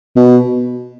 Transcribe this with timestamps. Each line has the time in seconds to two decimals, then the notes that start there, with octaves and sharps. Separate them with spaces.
0.16 B2